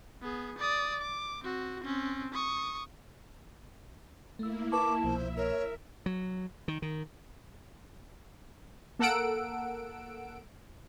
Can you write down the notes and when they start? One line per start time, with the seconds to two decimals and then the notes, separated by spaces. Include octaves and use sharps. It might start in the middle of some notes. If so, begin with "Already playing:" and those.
0.22 B3 G#4
0.58 D5 D#6
1.01 D6
1.44 C4 F#4
1.83 C4 C#4
2.34 C#6 D#6
4.39 A3 A#3 E4 E6
4.72 A#4 B4 A5 C#6 D6
5.04 C2 B2 F3 C5 E5
5.37 A#4 C#5
6.06 F#3
6.68 D#3
6.82 D#3
8.99 A#3 A4 A#4 F#5 E6 D7